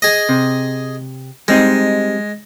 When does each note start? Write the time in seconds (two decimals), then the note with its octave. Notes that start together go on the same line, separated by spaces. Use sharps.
0.02 G#4 D#5
0.29 C3
1.48 G3 G#3 C4 D#4